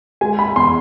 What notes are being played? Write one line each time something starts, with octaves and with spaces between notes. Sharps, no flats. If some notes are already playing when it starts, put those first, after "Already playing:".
G#3 G#5
B5
E2 C6